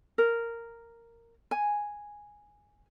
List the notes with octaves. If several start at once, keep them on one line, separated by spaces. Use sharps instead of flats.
A#4
G#5